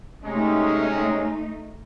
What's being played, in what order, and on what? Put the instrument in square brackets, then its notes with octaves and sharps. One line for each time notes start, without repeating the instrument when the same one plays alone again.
[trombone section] C3 C#4 [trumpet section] G#3 [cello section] A3 D#4